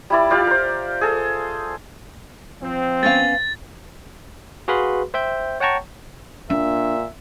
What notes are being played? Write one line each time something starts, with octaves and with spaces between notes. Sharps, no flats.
G3 E4 D5
F4 G4 D5 F5
A#4 C5
G#4 A4
F3 C4
B3 C#4 F5 A6
F#4 G#4 B4 F5 B5 C6
C5 E5 G5 G6
C#5 F#5 G5 A5 A#5 C#6
A#2 D4 E5